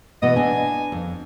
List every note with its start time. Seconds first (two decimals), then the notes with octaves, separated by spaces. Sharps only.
0.22 B2 E3 B3 D#5
0.36 B3 D4 G#5
0.92 F2